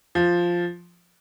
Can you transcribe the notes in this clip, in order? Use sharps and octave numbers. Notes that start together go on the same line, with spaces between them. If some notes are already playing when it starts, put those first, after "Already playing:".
F3